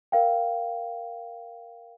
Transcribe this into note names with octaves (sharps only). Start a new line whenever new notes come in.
A#4 F5 G5